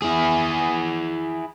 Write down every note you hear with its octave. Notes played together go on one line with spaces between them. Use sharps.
E4 G#4